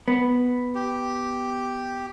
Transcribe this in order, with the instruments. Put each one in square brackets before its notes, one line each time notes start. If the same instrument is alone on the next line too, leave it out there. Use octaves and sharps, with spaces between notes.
[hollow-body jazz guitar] B3
[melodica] G4